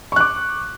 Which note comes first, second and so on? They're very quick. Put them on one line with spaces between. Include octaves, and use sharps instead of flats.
C#6 F#6 D6